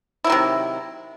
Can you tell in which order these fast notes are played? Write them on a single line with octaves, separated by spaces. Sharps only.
E4 F#3 D#3 C3